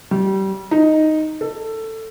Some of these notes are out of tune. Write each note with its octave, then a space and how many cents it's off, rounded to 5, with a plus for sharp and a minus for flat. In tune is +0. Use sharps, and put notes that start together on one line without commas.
G3 -25
D#4 +0
A4 +15